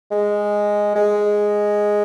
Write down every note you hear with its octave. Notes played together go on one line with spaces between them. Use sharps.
G#3
G#3